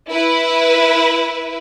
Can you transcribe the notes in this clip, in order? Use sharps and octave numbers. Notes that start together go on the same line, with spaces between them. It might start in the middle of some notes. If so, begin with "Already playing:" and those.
E4 B4